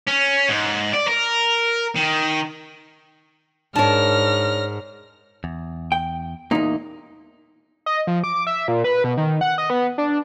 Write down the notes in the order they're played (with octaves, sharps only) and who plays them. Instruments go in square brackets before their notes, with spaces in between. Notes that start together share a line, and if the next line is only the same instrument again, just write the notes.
[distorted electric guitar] C#4
G#2
D5
A#4
D#3
[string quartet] G#2 [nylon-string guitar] D4 C#5 [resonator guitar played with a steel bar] A#4 A5 [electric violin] F6 A#6
[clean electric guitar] E2
[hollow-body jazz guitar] G5
[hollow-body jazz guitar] E2 A#2 [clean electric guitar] A#3 [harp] D#4
[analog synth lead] D#5
F3
D6
E5
A#2
B4
B2
D#3
F#5
D#5
B3
D4